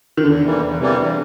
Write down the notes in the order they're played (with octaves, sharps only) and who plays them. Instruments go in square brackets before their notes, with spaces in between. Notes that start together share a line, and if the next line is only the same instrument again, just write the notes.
[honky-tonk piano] D#3
[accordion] E2 [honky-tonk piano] D3
[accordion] C3 E3 G3 A#3
E2
C3 E3 G3 A#3
E2